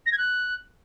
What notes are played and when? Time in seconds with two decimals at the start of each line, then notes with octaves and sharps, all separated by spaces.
0.06 A#6
0.12 G#6
0.17 F#6